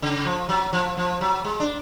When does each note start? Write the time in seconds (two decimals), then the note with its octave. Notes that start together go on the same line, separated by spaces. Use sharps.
0.02 C#3
0.25 F3
0.49 F#3
0.73 F3
0.97 F3
1.21 F#3
1.44 G#3
1.60 D4